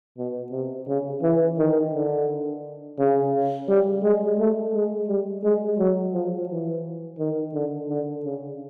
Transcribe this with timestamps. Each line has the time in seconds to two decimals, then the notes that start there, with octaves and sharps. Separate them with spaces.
0.17 B2
0.51 C3
0.87 C#3
1.22 E3
1.58 D#3
1.93 D3
2.98 C#3
3.68 G3
4.03 G#3
4.39 A3
4.74 G#3
5.08 G3
5.43 G#3
5.79 F#3
6.14 F3
6.49 E3
7.18 D#3
7.54 D3
7.89 D3
8.25 C#3